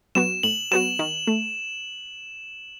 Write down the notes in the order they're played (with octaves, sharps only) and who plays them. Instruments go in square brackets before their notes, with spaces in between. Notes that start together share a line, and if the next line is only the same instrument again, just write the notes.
[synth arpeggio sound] F#3 B3 F#4 [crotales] E7
[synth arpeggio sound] A2 [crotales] F#7
[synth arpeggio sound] F#3 B3 F#4 [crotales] E7
[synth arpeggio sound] D#3
A3